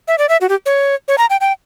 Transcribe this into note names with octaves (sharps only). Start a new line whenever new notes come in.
E5
D5
E5
F#4
G4
C#5
C#5
A#5
G5
G5